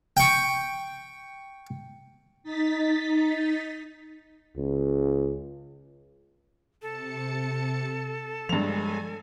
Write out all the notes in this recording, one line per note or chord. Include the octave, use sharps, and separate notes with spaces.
G5 C#6
D#4 A6 B6
C#2
C3 A4 A5 C#7
G2 F3 G#3 G#5 F7